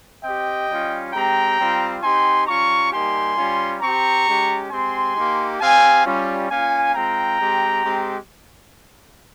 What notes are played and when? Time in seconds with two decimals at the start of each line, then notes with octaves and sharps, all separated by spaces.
0.23 C4 G4 D#5 G5
0.68 G3 C#4 F4
1.13 G#3 C4 G4 G5 A#5
1.58 G3 C4 F4
2.03 C4 D#4 G4 G#5 C6
2.47 G3 C#4 F4 A#5 C#6
2.92 G3 A#3 D#4 G4 G#5 C6
3.37 G3 C#4 F4
3.81 C4 G4 A#5 C#6
4.27 G#3 C#4 G4
4.71 G#3 C4 G4 G#5 C6
5.16 A#3 D#4 G4
5.60 C4 G4 F5 G#5
6.05 G3 C#4 F4
6.50 A#3 C#4 F4 F5 G#5
6.95 G#3 C4 F4 G5 A#5
7.40 G#3 C4 G4
7.85 G#3 C4 G4